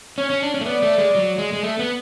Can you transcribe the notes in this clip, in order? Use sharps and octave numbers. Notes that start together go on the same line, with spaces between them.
C#4 C#5
C#4
D4
C#4
A3
B3 D5
A3
G#3
F#3
G#3
G#3
A3
B3